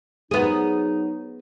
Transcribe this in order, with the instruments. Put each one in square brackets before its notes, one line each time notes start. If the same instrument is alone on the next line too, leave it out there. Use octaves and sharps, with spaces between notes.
[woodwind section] F#3 D#4 [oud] B3 G#4